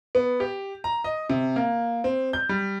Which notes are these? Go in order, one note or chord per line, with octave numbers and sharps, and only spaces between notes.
B3
G4
A#5
D#5
C3
A#3
C4
G6
G3